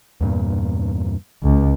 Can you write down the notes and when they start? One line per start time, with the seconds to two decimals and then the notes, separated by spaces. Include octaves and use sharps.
0.21 E2 G2 A#2
1.43 C#2